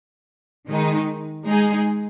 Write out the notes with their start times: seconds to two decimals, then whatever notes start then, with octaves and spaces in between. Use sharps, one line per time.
0.69 D#3 G#3 D#4
1.47 G#3 D#4 G#4